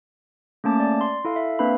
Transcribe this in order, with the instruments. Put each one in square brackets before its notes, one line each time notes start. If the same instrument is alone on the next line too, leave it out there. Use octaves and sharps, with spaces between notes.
[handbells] A3 A#3 C#4 A5 D6
D5
C6
E4 A4 F5
E5
A#3 C4 D4 B4 F5 B5